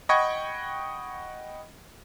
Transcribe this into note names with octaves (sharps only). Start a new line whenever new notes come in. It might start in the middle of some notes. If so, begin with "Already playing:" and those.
D#5 F#5 G5 B5 C#6 G#6